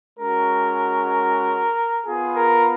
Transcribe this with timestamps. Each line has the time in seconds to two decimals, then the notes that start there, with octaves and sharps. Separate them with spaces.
0.20 G#3 C#4 F#4 A#4
2.05 B3 F4 G#4
2.36 A#4